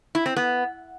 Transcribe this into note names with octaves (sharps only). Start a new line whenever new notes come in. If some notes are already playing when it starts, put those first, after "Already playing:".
E4
C4
B3